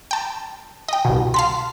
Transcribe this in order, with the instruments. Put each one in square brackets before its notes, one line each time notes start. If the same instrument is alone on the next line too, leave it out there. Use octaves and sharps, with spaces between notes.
[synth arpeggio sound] G5 A5
D#5 G5
C2 B2
[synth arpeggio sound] F5 A5 B6 [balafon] C6